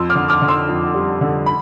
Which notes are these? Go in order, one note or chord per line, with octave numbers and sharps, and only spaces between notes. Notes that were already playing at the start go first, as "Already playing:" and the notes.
Already playing: F2 C6 E6
D6 F6
D3
D6 F6
D3
C6 E6
F2
G3
D3
B5